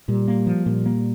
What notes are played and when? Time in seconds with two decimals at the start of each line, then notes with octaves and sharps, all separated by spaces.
0.08 A#2 G3
0.28 A#3
0.47 F3
0.66 A#2 G3
0.86 A#3